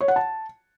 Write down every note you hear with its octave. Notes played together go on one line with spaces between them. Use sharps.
C#5
F#5
A5